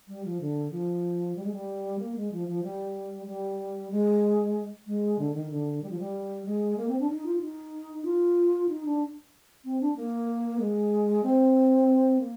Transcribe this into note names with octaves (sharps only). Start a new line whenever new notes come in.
G3
F3
D3
F3
G3
G#3
G3
A#3
G#3
F3
F3
G3
G3
G#3
G#3
D3
D#3
D3
G3
F3
G3
G#3
A#3
C4
D4
D#4
F4
D#4
F4
D#4
D4
C4
D4
A#3
G#3
C4
A#3